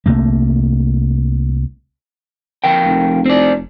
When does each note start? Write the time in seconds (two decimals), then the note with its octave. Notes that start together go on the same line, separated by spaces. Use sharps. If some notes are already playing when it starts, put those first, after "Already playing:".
0.06 C2 C3 A3 A#3
2.64 F2 A#4 G5
2.85 F1
3.26 C4 D5